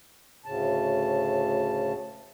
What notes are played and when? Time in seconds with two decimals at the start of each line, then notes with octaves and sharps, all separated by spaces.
0.45 D2 A2 C#3 A5